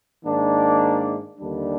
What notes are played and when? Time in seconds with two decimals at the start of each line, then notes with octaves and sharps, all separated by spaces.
0.24 G#2 D#3 A#3 D4
1.39 D#2 D3 G3 D4